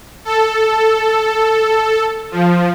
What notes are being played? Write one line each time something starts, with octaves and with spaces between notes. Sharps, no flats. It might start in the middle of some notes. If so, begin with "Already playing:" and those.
A4
F3